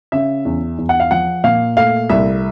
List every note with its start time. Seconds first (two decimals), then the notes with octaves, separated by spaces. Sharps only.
0.12 C#3 E5
0.45 E2
0.78 E2
0.89 F#5
1.00 F5
1.11 F3 F#5
1.44 A#2 F5
1.77 A3 F5
2.10 C2 E5